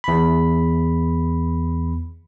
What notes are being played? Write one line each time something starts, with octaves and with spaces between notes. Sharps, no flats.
E2 B5